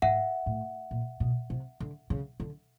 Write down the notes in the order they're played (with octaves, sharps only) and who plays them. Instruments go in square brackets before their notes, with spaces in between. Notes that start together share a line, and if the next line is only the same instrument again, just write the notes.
[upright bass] G#2 [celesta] E5 F#5
[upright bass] A2
A#2
B2
C3
D3
C#3
D3